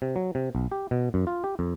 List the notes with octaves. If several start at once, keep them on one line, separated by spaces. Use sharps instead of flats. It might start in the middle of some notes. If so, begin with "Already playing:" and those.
C3
F#3
C3
B1
G4
B2
F#2
F4
G4
F2